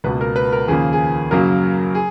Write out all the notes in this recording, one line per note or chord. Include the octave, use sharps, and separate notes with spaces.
C#2 B2 A#3 B4
A#4
B4
A#4
D#2 C#3 F3 A#3 G#4
G#4
F#2 C#3 F#3 A#3 A#4
G#4